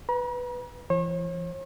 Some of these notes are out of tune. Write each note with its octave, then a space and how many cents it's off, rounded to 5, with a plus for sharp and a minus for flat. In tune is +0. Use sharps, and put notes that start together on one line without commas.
B4 +0 A#5 +45
E3 +45 C#5 -45